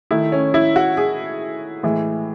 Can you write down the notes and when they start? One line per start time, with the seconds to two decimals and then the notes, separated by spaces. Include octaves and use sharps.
0.11 D#3 A3 E4
0.32 C#4
0.54 E4
0.76 F#4
0.97 G#4
1.83 A2 E3 G#3